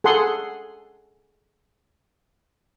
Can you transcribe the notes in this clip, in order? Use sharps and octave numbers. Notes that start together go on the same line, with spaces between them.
G#4 A4 F#5 C6